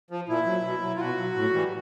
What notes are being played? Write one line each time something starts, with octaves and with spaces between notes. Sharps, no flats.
F3
A#2 E4
F#3
B2
F#3
F4
B2 F#4
F#3
A2
E3 G3